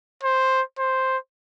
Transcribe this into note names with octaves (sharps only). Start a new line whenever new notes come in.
C5
C5